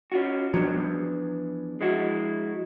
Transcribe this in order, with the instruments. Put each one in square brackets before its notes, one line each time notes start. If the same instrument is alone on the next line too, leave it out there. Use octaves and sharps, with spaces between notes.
[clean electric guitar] C#4 F4 F#4
[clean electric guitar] G2 B2 F#3 [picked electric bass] F3 D4
[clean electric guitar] E2
G#3 E4 F#4